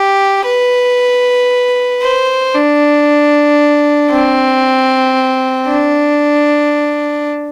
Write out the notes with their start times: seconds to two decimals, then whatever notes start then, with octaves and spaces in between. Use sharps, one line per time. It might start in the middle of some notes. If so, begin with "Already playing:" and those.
Already playing: G4
0.45 B4
2.03 C5
2.55 D4
4.10 C4
5.67 D4